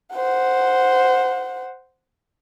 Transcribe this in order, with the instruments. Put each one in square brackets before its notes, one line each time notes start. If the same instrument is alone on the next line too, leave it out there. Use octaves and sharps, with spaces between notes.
[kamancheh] C5 F#5